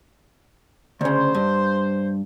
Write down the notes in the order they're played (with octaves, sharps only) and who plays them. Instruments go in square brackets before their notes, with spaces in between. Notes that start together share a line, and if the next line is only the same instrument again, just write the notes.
[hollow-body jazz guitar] D2 C#3 [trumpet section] C5
[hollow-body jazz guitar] G2